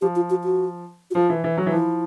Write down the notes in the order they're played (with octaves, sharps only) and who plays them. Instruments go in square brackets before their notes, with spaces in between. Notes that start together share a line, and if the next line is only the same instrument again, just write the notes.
[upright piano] F3 [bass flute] G4
[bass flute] F4
F#4
F#4
F#4
[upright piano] F3 [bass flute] F4
[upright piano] E3
E3
F#3
E3
[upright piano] F3 [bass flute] E4